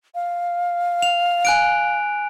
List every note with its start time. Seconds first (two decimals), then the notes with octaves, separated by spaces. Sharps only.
0.15 F5
1.02 F7
1.45 G#5 F#6 D7